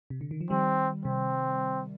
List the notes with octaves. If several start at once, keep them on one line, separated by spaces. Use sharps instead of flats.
C3
D3
D#3
F3
D#3 G3 C4
C3 C4